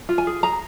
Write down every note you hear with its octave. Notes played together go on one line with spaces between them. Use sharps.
F4
G#5
G#4
G#4 A#5